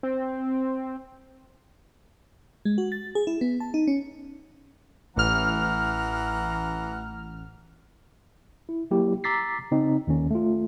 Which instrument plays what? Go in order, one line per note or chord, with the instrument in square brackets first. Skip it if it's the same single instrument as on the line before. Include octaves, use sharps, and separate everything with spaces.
[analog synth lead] C4
[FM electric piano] G#3
F#4
A6
G#4
E4
B3
A5
D#4
C#4
[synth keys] A1 F6 [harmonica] E3 F#5 A#5
[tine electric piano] E4
F#3 A#3 E4 G4
A#5 D6 E6 A6 B6 C7
C#3 C4 D#4
D#2 D#3 C#4
A3 F4